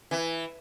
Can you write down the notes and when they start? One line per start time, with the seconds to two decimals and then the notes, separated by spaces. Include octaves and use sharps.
0.11 E3